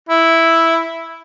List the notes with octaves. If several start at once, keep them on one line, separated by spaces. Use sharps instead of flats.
E4